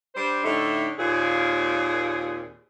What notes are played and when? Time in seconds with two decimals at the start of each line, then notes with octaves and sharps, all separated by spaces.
0.15 G3 D4 C5
0.44 A2 D3 A3 D#4 E5
0.98 D#2 A#2 C4 G#4